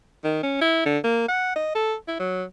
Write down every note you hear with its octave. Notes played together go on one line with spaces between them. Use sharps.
D#3
C#4
E4
D3
A#3
F#5
D#5
A4
E4
F#3